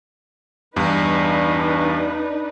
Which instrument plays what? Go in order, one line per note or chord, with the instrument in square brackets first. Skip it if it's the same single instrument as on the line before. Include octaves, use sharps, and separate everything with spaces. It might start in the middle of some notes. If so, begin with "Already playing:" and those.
[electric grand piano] E2 G2 [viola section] D4 D#4 B4